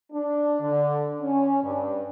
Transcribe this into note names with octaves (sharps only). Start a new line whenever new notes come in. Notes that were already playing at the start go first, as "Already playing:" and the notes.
D4
D3
C#4
G2